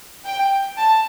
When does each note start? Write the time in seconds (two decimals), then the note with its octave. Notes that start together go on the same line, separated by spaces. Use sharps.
0.25 G5
0.77 A5